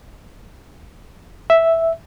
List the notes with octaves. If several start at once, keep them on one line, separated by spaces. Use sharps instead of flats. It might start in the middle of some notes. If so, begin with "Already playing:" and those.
E5